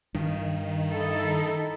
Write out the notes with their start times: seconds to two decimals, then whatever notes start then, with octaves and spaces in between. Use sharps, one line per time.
0.14 G2 D#3
0.92 D#4 E4 A4